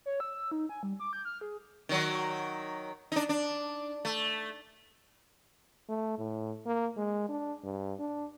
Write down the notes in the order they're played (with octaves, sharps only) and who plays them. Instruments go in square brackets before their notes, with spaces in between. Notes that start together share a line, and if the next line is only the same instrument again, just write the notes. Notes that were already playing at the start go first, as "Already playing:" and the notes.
[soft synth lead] C#5
E6
D#4
G#5
G3
D6
G6
F6
G#4
[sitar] D#3 F#3
D4 D#4
D4
A3
[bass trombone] A3
A2
A#3
G#3
D4
G2
D4